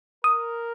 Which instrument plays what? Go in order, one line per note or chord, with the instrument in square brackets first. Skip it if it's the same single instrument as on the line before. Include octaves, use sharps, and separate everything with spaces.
[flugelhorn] A#4 [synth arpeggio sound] D#6